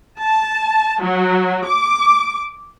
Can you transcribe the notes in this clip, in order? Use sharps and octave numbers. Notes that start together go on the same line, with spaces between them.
A5
F#3
D6